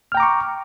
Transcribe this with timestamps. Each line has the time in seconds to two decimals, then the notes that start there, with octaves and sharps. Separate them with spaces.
0.12 F6
0.15 G5
0.17 A#5
0.20 D6
0.23 C#6